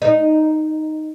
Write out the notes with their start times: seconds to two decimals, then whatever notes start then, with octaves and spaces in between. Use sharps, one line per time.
0.02 D#4